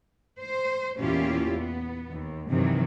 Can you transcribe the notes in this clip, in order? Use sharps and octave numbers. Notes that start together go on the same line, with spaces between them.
C5
E2 A#2 C#4 E4 F4 G4
B3
D#2
G2 C3 D#3 E3 F#3